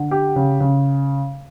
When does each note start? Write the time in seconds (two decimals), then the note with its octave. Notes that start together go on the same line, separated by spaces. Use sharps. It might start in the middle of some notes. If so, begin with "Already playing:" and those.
Already playing: D3
0.11 G4
0.36 C#3
0.60 C#3